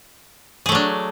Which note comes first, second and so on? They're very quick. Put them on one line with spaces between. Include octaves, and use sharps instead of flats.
G#4 A3 F#3 D4